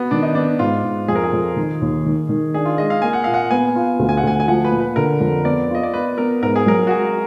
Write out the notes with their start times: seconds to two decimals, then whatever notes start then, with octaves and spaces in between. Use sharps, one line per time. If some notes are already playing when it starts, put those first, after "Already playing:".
Already playing: B3 F#4
0.11 D#3 D4
0.23 D#4
0.35 B3 D4
0.59 G#2 F4
0.84 G#2
1.08 F2 G#4
1.15 A#4
1.24 G#4
1.33 F2
1.56 D#3
1.81 D#2
2.05 D#3
2.29 D#3
2.54 D4 G#4
2.65 F4
2.78 G#3 D#5
2.90 F5
3.02 A#3 G#5
3.13 F#5
3.24 A#2 F5
3.34 F#5
3.51 B3 G#5
3.75 F4
3.99 D2
4.09 G#5
4.17 F#5
4.23 D2 G#5
4.40 G#5
4.47 F3 F#5
4.65 B4
4.72 A#2
4.80 B4
4.96 D3 A#4
5.20 F2
5.44 B3 D5
5.70 F4 D#5
5.83 D5
5.94 B3 B4
6.18 B3 A#4
6.42 G#2 A#4
6.56 G#4
6.66 F#3 A#4
6.87 F#4
6.91 G#3 G#4